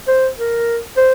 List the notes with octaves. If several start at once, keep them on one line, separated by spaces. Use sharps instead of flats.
C5
A#4
C5